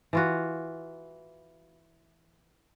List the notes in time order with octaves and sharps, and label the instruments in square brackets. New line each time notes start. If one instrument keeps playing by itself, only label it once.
[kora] E3 F4 F#4